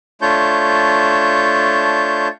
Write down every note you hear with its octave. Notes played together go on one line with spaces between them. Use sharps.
A3 D4 F4 C#5 A5 G6